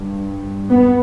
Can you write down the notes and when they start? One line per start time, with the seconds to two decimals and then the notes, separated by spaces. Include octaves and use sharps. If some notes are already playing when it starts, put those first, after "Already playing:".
Already playing: G2
0.69 B3